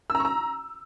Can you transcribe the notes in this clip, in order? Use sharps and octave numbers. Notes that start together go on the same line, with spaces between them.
E6
A#5
C#6
A#5